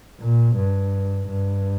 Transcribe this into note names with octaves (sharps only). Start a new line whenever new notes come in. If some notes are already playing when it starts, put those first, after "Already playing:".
A#2
G2
G2